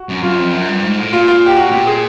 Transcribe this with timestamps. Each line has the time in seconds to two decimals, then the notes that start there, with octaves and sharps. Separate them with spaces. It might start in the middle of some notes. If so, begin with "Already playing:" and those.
Already playing: F#4
0.09 F#2
0.23 F#2 F4
0.38 F2
0.53 F#2
0.69 G2
0.83 G#2
0.98 A2
1.13 A#2 F4
1.28 F4
1.46 G4
1.56 F#4
1.71 A#2 G4
1.87 G#4